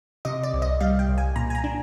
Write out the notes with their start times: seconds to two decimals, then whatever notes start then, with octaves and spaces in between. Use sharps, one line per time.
0.25 C3 D#5
0.43 D5
0.54 C2
0.62 D#5
0.81 G3 F5
0.99 G5
1.08 C2
1.18 G#5
1.36 A#2 A#5
1.50 G#5
1.55 A#5
1.64 D4